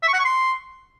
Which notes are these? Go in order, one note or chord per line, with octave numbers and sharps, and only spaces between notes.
E5
C#6
F#5
C#6
C6